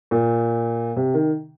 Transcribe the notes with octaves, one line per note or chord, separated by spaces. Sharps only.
A#2
C3
D#3